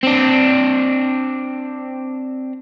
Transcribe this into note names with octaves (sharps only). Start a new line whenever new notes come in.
C4 D4